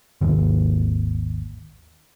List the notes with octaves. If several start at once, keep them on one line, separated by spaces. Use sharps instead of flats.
G#1 D#2